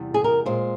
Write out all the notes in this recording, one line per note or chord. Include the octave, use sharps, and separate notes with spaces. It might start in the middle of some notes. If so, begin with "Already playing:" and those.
Already playing: E2 C3 G3
G#4
A#4
A#2 G#3 C5